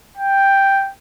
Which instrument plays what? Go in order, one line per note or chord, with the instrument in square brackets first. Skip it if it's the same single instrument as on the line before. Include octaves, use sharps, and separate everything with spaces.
[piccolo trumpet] G5